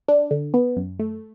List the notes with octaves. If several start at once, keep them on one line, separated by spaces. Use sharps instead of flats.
D4
D3
B3
F#2
A3